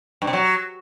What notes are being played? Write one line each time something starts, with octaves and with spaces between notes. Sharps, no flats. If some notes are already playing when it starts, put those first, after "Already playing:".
G2
C3
F#3